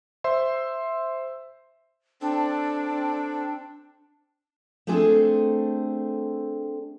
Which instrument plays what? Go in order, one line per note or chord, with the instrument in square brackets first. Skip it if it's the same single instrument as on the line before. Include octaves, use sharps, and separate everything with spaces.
[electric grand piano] C5 E5 C6
[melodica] C4 A4 [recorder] D4
[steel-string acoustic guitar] A3 C4 D4 G#4 A4 C5